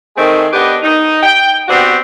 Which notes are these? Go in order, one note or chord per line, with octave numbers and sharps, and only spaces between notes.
D#3 A3 C4 G#4
B3 D4 G4 B4 D#5
D#4
G5
B3 C4 D4 F#4 G4